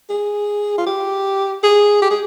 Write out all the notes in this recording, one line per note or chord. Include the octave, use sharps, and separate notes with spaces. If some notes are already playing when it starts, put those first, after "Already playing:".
G#4
F4
G4
G#4
G4
G#4